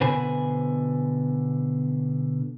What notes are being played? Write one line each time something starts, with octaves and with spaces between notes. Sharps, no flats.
B2 D3 B4 C5 G#5 B5